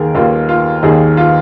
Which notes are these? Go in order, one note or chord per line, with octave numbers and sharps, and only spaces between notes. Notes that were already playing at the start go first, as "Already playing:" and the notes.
Already playing: D#2 D#3 A#3 G#4 A#4
D#2 D#3 A#3 F4
F4
D#2 D#3 A#3 G#4
F4